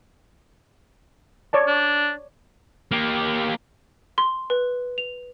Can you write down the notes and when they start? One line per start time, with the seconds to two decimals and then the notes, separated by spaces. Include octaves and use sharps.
1.53 C#5 D5 A5
1.67 D4
2.91 A#3 G4
4.18 C6
4.50 B4
4.98 F7